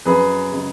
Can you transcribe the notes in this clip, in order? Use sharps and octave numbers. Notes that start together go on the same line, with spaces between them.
F#2 G#4 B4
C#3 G#3